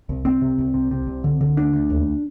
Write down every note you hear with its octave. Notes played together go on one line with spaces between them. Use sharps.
C2
C2 C4
C3
C2
C3
C3
C2
D3
D3
D2 D4
D2
D#2